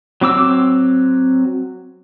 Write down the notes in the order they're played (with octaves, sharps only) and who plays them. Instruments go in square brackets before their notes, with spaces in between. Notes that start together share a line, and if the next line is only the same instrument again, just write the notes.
[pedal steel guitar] F#3 C4 D6 E6